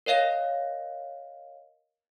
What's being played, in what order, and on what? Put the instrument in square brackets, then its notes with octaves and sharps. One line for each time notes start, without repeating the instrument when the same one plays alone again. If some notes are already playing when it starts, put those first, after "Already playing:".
[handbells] A#4 C#5 D#5 F5 A#6